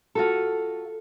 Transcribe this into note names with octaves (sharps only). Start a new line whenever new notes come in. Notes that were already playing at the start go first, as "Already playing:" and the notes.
F4 F#4 A4